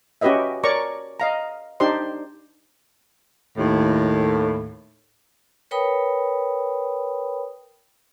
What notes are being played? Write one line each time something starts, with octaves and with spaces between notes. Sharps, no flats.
C#4 F#4 G4 B4 D#5 E5
A#4 C#5 D5 A#5 C#6 D6
D#5 F5 A#5
D4 D#4 G4 C5 D5 C6
D#2 A2
A#4 B4 C#5 G5 B5 D#6